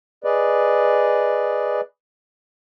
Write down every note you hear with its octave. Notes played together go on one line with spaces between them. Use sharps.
G#4 B4 D5 D#5